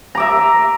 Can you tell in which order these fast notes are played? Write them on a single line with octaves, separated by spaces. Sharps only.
A#5 D6 E5